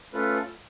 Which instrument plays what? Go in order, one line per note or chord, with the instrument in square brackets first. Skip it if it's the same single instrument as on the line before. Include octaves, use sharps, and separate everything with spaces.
[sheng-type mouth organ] A3 C#4 F4 A4 B4